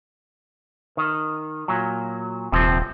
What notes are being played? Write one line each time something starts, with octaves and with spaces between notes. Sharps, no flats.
D#3
A#2 F#3
D#1 C3 F3 C4